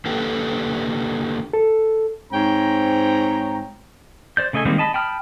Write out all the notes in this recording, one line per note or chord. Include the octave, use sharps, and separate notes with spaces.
D3 A#3 G4 A4 B4
A4
G#2 C4 C#5 G5 A#5
C5 D5 G6
C#3 A3 D#5 E5 G#5
D#3 G3 G#3 A#3 C4
D#5 A5 B5
G5 A5 B5 D#6 F6